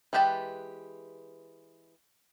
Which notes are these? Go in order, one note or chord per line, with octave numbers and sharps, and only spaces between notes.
E3 G#3 G4 B4 A5